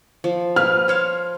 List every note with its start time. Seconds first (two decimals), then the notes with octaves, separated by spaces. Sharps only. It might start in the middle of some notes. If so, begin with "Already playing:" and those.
0.24 F3
0.56 B4 F6
0.88 C5 C#5 F5